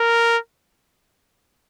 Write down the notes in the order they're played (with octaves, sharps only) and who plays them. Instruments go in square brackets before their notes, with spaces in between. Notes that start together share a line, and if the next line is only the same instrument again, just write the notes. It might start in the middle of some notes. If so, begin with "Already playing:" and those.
Already playing: [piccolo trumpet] A#4